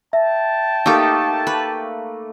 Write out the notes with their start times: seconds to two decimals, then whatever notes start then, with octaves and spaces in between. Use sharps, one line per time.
0.13 E5 G5 A5
0.86 A3 A#3 D#4 G4
1.47 B4